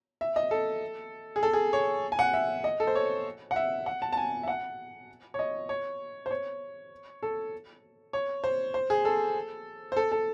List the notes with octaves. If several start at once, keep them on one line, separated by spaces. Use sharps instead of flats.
E5
D#5
A4
G#4
A4
G#4
C#5
G#5
F#5
E5
D#5
A4
C5
C#5
F#5
E5
F#5
A5
A5
G#5
E5
F#5
C#5
D#5
C#5
C5
C#5
A4
C#5
C5
C5
G#4
A4
C5
A4
A4